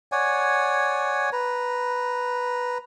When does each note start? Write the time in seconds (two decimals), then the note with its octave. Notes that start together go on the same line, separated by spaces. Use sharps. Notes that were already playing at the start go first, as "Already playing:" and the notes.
0.12 C#5 D5 F#5 G#5
1.32 B4 A#5